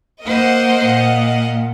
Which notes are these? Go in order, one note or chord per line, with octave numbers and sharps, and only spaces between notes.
A#3 C5 D#5 F5 F#5
A#2